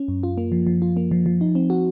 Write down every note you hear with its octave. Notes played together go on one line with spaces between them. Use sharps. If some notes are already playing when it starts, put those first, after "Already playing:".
Already playing: C#4
F#2
F4
A#3
F3
F3
F4
A#3
F3
F3
D#4
C4
F#4